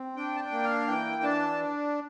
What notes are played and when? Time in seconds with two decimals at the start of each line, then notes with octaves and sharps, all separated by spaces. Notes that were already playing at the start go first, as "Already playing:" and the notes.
Already playing: C4
0.16 D4 G5
0.35 A5
0.40 G5
0.51 A#3
0.64 F5
0.87 E3 G5
1.23 D4 A5